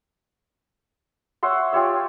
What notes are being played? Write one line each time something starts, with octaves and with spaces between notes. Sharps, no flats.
C#5 E5 F#5 C6
F4 G4 C#5 E5